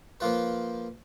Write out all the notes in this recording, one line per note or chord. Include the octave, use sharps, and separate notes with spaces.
F3 A#3 F4 B4